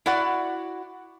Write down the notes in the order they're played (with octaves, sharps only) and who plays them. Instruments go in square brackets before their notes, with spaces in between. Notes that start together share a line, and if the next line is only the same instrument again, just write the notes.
[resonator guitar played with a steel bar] E4 F#4 D5 F#5